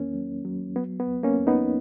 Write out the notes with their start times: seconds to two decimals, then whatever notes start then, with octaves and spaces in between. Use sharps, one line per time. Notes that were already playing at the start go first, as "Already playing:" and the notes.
Already playing: E2 D#3 A#3 C#4
0.13 F#3
0.45 F#3
0.76 F#3 B3
1.00 B3
1.08 E2
1.23 A#3 C#4
1.40 E2
1.47 B3 D#4